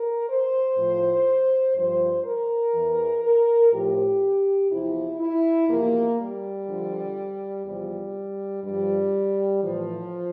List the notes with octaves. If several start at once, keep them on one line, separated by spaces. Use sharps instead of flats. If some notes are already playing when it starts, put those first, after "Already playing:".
Already playing: A#4
C5
A2 F3
G2 F3 C5
A#4
E2 E3
A#4
A2 F3 G4
E2 C3 F3 E4
E4
E2 C3 F3 A#3
G3
F2 D3 F3
E2 C3 F3 G3
G2 F3 G3
A2 E3 F3